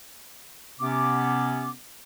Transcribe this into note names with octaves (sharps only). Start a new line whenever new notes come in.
C3 B3 C#4 D6